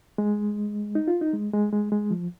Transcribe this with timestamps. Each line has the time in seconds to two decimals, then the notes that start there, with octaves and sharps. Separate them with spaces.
0.18 G#3
0.95 D#4
1.08 F4
1.21 D#4
1.34 G#3
1.53 G#3
1.73 G#3
1.92 G#3
2.11 F3